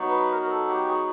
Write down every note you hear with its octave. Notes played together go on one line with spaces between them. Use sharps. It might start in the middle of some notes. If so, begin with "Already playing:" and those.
Already playing: F#3 B3 D#4 F#4
B4
A#4
A#4
A4
G4
G#4